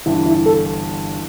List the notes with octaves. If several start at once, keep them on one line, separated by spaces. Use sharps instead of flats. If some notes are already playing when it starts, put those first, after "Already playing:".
G1 G2 E3 E4
E4
A4